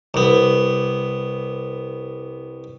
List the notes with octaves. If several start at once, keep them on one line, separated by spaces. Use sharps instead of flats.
C2 B3